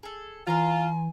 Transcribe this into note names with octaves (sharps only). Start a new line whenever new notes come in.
G#4 A4
E3 F4 G#5 A#5 C6